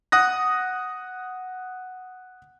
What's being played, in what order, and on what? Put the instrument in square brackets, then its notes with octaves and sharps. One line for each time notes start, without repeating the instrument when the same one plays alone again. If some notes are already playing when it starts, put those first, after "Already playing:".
[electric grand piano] F#5 D#6 F#6 A#6